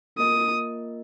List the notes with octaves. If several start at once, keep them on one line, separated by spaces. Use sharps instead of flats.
A#3 F4 A#4 D#5 D#6